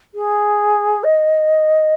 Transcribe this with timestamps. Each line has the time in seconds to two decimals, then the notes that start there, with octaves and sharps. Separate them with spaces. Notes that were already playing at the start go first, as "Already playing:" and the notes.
0.15 G#4
1.04 D#5